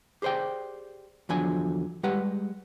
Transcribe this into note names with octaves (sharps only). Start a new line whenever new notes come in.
G4 G#4 C5 D5 G5
E2 D3 F3 F#3 D4 G#5
G3 G#3 G4 B4 F#5